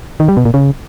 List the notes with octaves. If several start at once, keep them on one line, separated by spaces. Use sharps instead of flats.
D#3
G3
B2
A#2
C#3